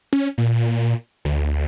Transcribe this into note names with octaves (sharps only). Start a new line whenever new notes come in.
C#4
A#2
D2